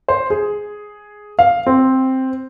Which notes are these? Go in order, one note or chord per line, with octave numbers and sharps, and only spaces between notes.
C5
G#4
F5
C4